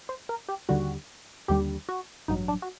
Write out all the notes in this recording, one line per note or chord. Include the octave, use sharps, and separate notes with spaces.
C5
A#4
G4
D#2 D3 G3 F#4
D#2 D3 G3 G4
F#4
A1 G2 F#3 D#4
D4
F#4